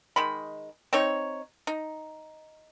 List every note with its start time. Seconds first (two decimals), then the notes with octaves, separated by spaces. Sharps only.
0.16 D#3 G#3 B5
0.93 C4 D#4 C#5
1.67 D#4